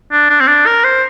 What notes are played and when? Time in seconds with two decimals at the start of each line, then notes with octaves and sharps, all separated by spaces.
0.12 D4
0.30 D4
0.41 C4
0.48 D4
0.67 A#4
0.84 C5